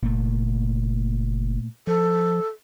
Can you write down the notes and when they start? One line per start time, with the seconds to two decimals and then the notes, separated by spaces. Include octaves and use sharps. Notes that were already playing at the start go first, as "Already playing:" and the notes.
0.02 F#1 A#2 A3
1.87 F3 A4